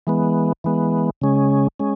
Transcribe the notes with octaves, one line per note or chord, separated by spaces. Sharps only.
E3 G#3 B3
E3 G#3 B3
C#3 G#3 C#4
G#3 C#4